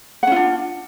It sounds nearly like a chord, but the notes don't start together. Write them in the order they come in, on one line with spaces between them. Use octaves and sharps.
F#5 C#4 F4 D4